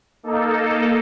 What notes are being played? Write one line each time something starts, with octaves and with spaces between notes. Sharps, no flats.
A#3 D#4 A4